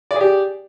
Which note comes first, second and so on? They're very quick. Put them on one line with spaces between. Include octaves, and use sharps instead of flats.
D5 G#4 G4